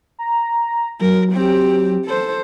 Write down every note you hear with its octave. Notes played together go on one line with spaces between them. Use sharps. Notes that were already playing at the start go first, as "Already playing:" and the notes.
A#5
F#3 A#4
C4 G4
A4 C5